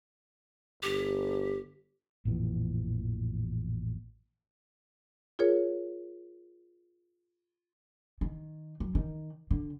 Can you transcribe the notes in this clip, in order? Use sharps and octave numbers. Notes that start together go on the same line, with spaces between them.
G1 G4
A1 F2 A#2 E3
F4 G#4 A#4 C#5
D#3
F#2
D#3
D3